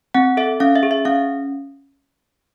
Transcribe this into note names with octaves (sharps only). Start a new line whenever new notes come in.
C4 F#5
A4 E5
C#4 F5
E5
G#4
E5
C#4 F5